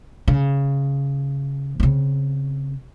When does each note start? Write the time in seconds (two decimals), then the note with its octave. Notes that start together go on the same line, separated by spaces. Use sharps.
0.28 C#3
1.80 C#3 C4